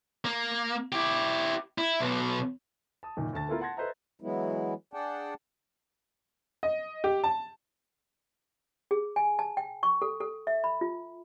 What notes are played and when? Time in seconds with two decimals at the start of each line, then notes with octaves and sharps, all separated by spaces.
0.25 A#3
0.92 E4 G4
1.78 E4
2.00 B1 B2
3.03 A5 D#6
3.17 F#1 A#2 D#3
3.33 D2 D3 A5 A6
3.49 A3 B3 E4 F4 A#4
3.61 F#5 A5 C6 G#6 A#6
3.77 A4 B4 C5 D#5 E5 A#5
4.20 E3 F#3 G#3 B3 E4
4.94 D4 G#4 D5 F#5 G5 A5
6.63 D#5
7.04 G4
7.24 A5
8.91 G#4
9.16 G#5
9.39 A5
9.57 G5
9.83 C#6
10.02 A4
10.20 A4
10.47 E5
10.64 B5
10.81 F4